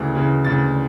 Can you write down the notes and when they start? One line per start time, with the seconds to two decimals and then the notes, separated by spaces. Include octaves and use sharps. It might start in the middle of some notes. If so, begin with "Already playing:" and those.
Already playing: D2 C#3 E3
0.15 D2 C#3 E3
0.44 D2 C#3 E3 A6